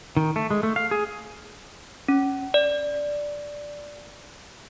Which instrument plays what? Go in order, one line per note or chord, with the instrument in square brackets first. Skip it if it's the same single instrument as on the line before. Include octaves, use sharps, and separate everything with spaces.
[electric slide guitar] D#3
A3
G#3
A3
F5
G#4
[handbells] C#4
D5